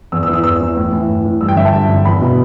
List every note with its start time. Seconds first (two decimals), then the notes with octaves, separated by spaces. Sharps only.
0.12 E2 E6
0.23 E6
0.28 E3
0.33 E6
0.44 E2 E6
0.60 E3
0.77 A2
0.93 E3
1.09 A2
1.25 E3
1.41 G2 E6
1.49 G5
1.56 D3 E5
1.65 A5
1.73 G2
1.89 D3
2.05 E2 B5
2.21 B2